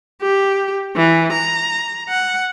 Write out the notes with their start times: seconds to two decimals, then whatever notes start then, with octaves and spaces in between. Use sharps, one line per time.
0.22 G4
0.96 E3
1.33 A#5
2.09 F#5